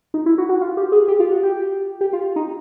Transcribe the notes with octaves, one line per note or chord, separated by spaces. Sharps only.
D#4
E4
F#4
F#4
F4
G4
G#4
G4
F4
F#4
G4
G4
F4
D#4